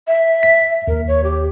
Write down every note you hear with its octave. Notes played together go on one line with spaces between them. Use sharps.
E5
B6
D#2 A#4
C#5
G4